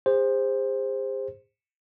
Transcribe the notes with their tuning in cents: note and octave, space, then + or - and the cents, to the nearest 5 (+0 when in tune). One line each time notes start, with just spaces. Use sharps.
G#4 -45 C5 +5